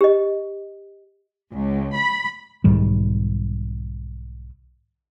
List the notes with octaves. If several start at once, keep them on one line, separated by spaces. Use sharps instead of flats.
G4 D#5
C#2
B5
B1 G#2 D#3 G3